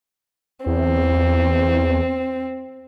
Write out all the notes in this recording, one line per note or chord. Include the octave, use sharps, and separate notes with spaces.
E2 C4